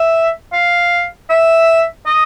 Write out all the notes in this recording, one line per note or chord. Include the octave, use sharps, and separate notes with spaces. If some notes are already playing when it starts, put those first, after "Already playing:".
Already playing: E5
F5
E5
D#5